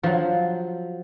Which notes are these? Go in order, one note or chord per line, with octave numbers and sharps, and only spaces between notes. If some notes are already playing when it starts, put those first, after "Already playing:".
F3 F#3